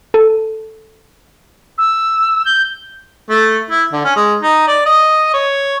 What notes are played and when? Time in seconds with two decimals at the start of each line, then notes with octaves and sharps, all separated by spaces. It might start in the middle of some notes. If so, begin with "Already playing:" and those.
0.14 A4
1.78 E6
2.45 G6
3.30 A3
3.70 E4
3.92 D3
4.04 C#4
4.16 G#3
4.41 D#4
4.67 D5
4.86 D#5
5.34 C#5